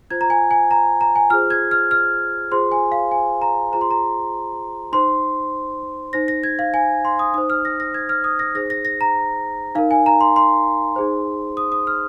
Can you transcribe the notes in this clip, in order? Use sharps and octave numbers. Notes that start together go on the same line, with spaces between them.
F4 C5 G#6
A#5
G#5
G#5
A#5
A#5
G#5
F4 G#4 C5 F6
G#6
F6
F6
F4 G#4 C5 C6
G#5
F5
G#5
A#5
F4 G#4 C5 A#5
C6
A#5
D#4 C5 C6
D#4 C5 A#6
A#6
G#6
F5
G#5
C6
D#6
D#4 C5 D#6
F6
A#6
A#6
G#6
F6
D#6
A#6
D#4 G#4 C5 A#6
A#6
A#6
A#5
D#4 A#4 F5
G#5
A#5
C6
C6
D#4 G#4 C5
D#6
D#6
F6